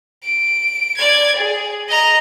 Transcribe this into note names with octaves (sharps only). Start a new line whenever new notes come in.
D7
D5 G#6
G#4
D#5 A#5